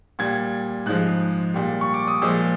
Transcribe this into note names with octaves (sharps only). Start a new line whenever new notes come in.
A#2 G3 G#6
G#2 F3 G#3 F#6
A#2 G3
C#6
D6
D#6
A#2 F3 G#3 E6